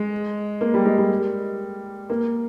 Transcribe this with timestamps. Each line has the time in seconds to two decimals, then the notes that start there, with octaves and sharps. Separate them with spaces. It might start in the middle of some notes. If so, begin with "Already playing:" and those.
Already playing: G#3
0.61 A#3
0.74 G3
0.85 G#3
0.98 G3
2.10 A#3